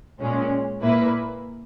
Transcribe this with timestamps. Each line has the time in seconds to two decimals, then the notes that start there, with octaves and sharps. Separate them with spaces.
0.20 A#2 G#3 C#4
0.81 A#2 A#3 E4 B4